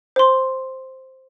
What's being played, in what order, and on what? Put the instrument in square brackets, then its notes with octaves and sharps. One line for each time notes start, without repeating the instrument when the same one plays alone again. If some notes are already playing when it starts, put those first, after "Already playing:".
[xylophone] C5 C6